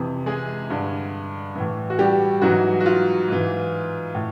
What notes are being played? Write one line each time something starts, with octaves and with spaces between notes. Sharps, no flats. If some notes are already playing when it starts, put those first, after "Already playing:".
Already playing: F2 C3 E3
G#3 G#4
G2 D3
A2 E3
F#4
G3 G4
G#2 E3 F#3 F#4
F#4
F4
G#2 E3
A2